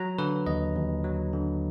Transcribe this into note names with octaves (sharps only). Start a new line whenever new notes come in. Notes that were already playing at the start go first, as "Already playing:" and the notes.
Already playing: F#3 A#5
D3 B4
D#2 D#5
D#2
F#3
D3